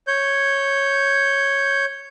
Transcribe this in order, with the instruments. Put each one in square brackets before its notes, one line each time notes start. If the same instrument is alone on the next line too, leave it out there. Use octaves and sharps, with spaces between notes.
[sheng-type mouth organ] C#5 G6